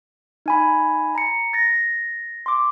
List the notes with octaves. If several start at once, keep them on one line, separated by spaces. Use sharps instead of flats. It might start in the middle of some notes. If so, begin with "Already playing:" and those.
D#4 G#5 B5
A#5 C#7
A6 A#6
C6 D6